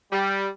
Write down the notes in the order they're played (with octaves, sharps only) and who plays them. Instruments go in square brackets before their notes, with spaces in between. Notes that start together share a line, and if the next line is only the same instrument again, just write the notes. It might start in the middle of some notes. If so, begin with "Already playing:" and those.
[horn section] G3